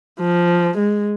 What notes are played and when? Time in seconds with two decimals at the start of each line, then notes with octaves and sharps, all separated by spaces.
0.20 F3
0.78 G#3